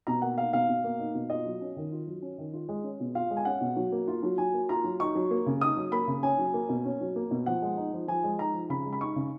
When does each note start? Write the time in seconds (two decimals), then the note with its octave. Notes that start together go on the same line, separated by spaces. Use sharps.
0.07 B2 A#5
0.22 A#3 F#5
0.38 D#4 F5
0.53 B2 F5
0.68 B2
0.84 A#3
0.99 D#4
1.14 B2
1.30 F4 D#5
1.46 F#3
1.61 C#4
1.77 D#3
1.92 F4
2.07 F#3
2.22 C#4
2.38 D#3
2.53 F4
2.69 G#3
2.84 C#4
3.00 B2
3.15 F4 F5
3.31 G#3
3.37 G#5
3.45 C#4 F#5
3.61 B2
3.76 F#3
3.92 A#3
4.08 F4
4.23 F#3
4.38 F#3 G#5
4.54 A#3
4.69 F4 A#5
4.84 F#3
5.00 D#4 C#6
5.15 F#3
5.31 A#3
5.46 C#3
5.61 D#4 D#6
5.77 F#3
5.92 A#3 B5
6.07 C#3
6.23 C#4 G#5
6.39 F#3
6.54 A#3
6.69 B2
6.85 C#4
7.01 F#3
7.16 A#3
7.31 B2
7.46 F3 F#5
7.62 G#3
7.77 D#4
7.93 F3
8.08 F3 G#5
8.24 G#3
8.39 D#4 A#5
8.54 F3
8.69 C#3 B5
8.86 G#3
8.93 B5
9.01 D#4 C#6
9.16 C#3